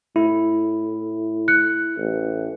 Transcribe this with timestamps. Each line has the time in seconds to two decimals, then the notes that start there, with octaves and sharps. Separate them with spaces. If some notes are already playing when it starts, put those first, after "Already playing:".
0.16 A2 E4
1.48 F#6 C#7
1.98 A1